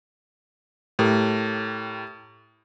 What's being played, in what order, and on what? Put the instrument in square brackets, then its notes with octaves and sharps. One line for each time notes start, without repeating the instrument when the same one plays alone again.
[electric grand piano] A2 G4 A#4